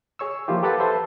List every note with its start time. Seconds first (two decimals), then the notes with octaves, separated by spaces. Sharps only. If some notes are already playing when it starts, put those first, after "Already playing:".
0.19 G#4 C#5 C#6 E6
0.48 F3 A#3 E4 F4 G4
0.63 G4 A4 B4 F#5 A5 B5
0.80 A4 B4 C5 E5